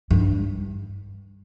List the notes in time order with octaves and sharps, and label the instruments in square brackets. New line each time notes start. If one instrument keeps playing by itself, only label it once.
[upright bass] G2